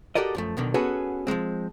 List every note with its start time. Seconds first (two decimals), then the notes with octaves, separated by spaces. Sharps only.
0.15 F#4 G4 A4 A#4 D5 D#5
0.35 F#2 F3 A3
0.57 B1 B2 D3 D#3
0.74 B3 C#4 F#4 G#4 A4 B4
1.27 F3 F#3 G#3 C4